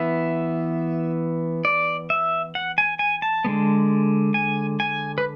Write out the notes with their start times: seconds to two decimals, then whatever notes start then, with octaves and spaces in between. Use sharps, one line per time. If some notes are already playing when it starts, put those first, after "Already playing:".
Already playing: E3 B3 E5
1.65 D5
2.10 E5
2.55 F#5
2.78 G#5
2.99 G#5
3.22 A5
3.44 D3 G#3 B3
4.34 G#5
4.80 G#5
5.18 B4